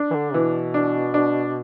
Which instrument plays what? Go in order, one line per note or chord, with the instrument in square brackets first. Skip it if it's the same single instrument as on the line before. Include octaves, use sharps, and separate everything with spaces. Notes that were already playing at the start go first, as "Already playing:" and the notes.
Already playing: [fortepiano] D4
[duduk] E3
D3
[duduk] B2 [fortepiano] E3
[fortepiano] D4
D4